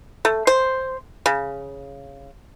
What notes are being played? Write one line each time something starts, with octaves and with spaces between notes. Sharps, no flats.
A3
C5
C#3